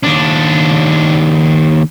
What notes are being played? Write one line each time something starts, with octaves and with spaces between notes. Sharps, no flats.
D#2 D4